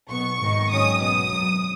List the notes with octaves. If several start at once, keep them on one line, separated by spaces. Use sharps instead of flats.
B1 B2 B3 C#6
G#1 G#2 D#3
G#2 D#3 F#3 C#4 D#6
B1 B2 B3 D#6
G#1 F#2 F#3